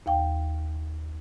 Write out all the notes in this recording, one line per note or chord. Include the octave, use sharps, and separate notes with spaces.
D#2 F5 G5